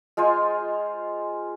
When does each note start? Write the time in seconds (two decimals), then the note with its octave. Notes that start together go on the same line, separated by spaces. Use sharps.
0.17 G#3 F4 C5 G#5